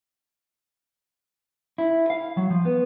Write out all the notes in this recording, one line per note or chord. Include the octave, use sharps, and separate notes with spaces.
E4
F5
F#3
F3
B3